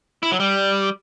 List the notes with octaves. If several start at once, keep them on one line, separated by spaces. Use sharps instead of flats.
E4
F#3
G3